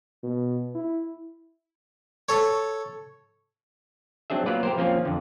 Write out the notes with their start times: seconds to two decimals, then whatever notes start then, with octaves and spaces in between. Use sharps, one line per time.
0.23 B2
0.75 E4
2.29 A4 C#5
4.30 F#3 C4 D4 G#4 E5
4.46 F#3 A#3 B3 F4 B4 D5
4.63 G4 A#4 C5
4.78 F3 A#3 C4 C#4 F4
5.05 F2 D3